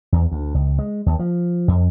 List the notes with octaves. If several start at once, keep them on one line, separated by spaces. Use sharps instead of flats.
E2
D2
C#2
G#3
D#2
F3
F2